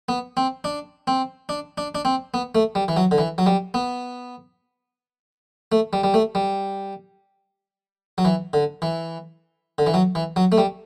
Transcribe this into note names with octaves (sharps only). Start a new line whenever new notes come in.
B3
C4
D4
C4
D4
D4
D4
C4
B3
A3
G3
E3
F#3
D3
E3
F#3
G3
B3
A3
G3
G3
A3
G3
F#3
E3
D3
E3
D3
E3
F#3
E3
F#3
A3
G3